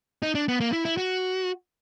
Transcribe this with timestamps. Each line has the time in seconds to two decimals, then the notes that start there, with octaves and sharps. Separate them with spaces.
0.23 D#4
0.35 D4
0.48 B3
0.60 A#3
0.73 E4
0.85 E4
0.97 F#4